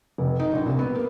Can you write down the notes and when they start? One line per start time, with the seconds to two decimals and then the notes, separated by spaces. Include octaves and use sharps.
0.18 F1
0.39 D#4
0.53 A#1
0.66 C2
0.79 B3
0.95 A#3